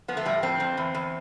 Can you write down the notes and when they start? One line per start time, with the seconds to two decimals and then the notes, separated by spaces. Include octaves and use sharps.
0.08 F3 B3
0.17 A3
0.25 A2 G3
0.43 F2 C4
0.60 F2
0.77 E2
0.95 E2